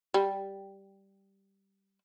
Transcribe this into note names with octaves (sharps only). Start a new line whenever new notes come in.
G3